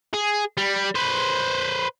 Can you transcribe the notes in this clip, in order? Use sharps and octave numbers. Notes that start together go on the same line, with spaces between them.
G#4
G3
B4 C5